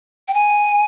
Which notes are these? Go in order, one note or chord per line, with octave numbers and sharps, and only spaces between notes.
G5
G#5